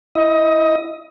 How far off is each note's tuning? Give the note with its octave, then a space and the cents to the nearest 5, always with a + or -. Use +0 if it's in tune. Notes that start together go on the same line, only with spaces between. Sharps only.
E4 +0 D#5 +20